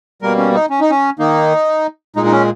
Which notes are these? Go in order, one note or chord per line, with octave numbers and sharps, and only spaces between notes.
B2 G3 A#3 A#4
C#4
D#4
C#4
D#4
C#4
D#3 A#3 D#4
A#2 G#3 D#4
D#4
C#4